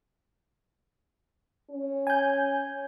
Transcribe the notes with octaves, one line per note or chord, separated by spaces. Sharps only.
C#4
G#5 G6